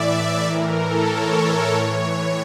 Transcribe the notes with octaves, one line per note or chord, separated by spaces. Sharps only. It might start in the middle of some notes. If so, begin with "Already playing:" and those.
Already playing: A2 E3 D5 E5
D5
A2 E3 A#4
A4
C#5
C#5
A2 E3